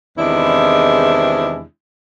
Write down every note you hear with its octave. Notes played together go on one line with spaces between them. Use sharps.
E2 C3 D#3 G#3 D4 E4